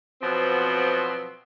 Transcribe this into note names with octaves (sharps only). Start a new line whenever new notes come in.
B2 F3 F#3 B3 C4